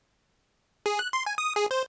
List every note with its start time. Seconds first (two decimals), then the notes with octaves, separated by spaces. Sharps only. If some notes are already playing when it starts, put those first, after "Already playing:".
0.86 G#4
0.99 F#6
1.13 C6
1.26 G#5
1.38 D#6
1.56 G#4
1.71 C5